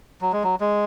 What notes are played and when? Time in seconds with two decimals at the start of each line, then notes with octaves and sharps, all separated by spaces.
0.21 F#3
0.32 G#3
0.44 F#3
0.60 G#3